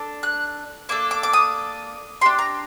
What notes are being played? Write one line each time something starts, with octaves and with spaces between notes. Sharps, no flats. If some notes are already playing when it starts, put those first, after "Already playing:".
Already playing: D4 A4
F#6
A#3 D4 A4 D6
D6
D6
D#6
D4 G4 C6
A#5